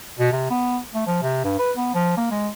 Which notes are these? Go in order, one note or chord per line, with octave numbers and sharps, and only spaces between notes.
B2
C3
B3
A3
F3
C3
G2
B4
B3
F3
A#3
G#3